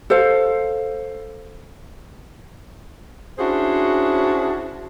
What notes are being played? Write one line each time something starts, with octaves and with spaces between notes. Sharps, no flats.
A4 C5 F5
C#4 D4 E4 F#4 G#4 C5